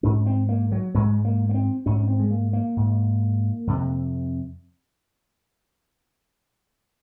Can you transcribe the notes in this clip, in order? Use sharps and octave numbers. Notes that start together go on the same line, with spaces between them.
G#2 C#4
C4
A#3
F#3
G#2 G#3
A#3
A#3
C4
G#2 C#4
C4
G#3
A#3
A#3
G#2
F2 C3